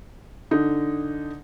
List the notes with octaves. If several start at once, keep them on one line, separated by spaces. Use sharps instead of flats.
D3 D#4